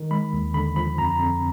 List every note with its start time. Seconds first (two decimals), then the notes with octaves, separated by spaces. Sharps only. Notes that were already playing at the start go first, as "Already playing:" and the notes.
Already playing: D#3
0.11 G#3 B5
0.33 D#2
0.54 D3 B5
0.76 F3 B5
0.98 F2 A#5
1.05 B5
1.11 A#5
1.19 F2